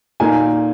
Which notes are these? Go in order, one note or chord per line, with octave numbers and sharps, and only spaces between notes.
A#2 A#3 D#4 G#5